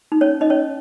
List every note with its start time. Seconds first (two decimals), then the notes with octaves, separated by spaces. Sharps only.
0.12 D#4
0.21 C#4 C#5
0.41 D#4 D#5
0.50 C#4 C#5